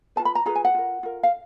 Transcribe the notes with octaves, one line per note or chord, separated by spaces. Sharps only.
F4 G#4 B4 A5
B5
A#5
F4 G#4 B4 A#5
G#5
F#5
F4 A#4
F4 A#4
F5